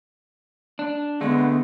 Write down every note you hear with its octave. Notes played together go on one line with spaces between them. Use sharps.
D4
D3 G#3 A3 B3